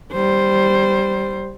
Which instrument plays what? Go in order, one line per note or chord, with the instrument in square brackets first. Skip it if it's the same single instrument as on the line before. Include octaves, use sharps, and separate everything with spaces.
[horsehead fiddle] G3 C5